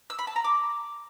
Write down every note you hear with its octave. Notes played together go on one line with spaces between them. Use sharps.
E6
B5
A5
A#5
D6